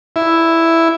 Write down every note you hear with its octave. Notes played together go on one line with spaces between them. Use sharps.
E4